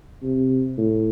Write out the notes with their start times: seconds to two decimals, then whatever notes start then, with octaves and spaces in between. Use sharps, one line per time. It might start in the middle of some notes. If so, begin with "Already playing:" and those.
0.23 C3
0.78 A2